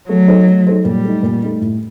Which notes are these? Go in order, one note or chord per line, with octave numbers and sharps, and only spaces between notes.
F#3 A3
D#4 A4 C5
A3
D#4 A4 C5
A#2 G3
A3 D#4
A#2
A3 D#4
A2